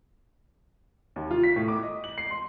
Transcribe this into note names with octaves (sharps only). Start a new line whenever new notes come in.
D#2
F4
B6
A2
D6
D#5
F#7
C7
C6